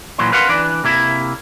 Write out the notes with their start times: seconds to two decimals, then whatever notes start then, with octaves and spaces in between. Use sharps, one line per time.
0.18 A#2 E3 F#3 C6
0.32 A#4 B4 F5 F#5 A#5 C6
0.49 E3 D4 B4 D5
0.84 C3 A#3 E4